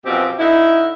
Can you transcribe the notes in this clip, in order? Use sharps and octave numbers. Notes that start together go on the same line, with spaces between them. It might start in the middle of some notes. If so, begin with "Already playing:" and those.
F#2 B2 F3 C4 G4
D3 D#4 E4